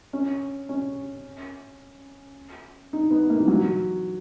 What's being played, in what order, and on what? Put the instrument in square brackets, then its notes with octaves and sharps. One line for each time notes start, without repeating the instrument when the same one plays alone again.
[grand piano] C#4
C#4
D#4
B3
A#3
E3
F#3